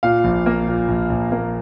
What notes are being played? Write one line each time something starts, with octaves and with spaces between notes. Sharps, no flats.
A#2 F5
A#1
A#3
A#2
A#1
A#1
A#3